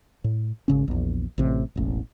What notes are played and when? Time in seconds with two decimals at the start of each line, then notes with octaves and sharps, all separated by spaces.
0.24 A2
0.68 G#1 C#3 C#4
0.88 A#1 E2
1.38 A1 C3
1.76 E1 A1